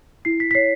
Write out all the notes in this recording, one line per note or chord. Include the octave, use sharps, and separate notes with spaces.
E4 C7
B6
B6
C#5 C7